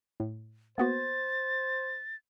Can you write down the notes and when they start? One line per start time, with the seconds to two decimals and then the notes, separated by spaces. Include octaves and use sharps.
0.20 A2
0.78 A#3 B3 F#4 C5 A6